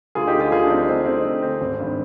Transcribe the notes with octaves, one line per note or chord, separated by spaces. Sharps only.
D2 F4 G#4
D#4 G4
D3
F4 G#4
D2 F4 G#4
D4
D3 C4 D#4
D2 C4 D#4
D3 C4 D#4
D2 C4
D3 C4
G#1
G2 D#3